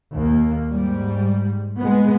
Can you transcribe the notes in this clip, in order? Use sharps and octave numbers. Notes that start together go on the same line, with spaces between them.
D#2 A#3
G#2 G3
G#3 B3